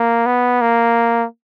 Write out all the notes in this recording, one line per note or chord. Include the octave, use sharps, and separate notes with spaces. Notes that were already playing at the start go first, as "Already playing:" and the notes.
Already playing: A#3
B3
A#3